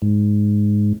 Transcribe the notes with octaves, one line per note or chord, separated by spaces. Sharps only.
G#2